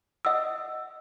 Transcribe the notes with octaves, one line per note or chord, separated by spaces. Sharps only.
D#5 F#5 D#6 E6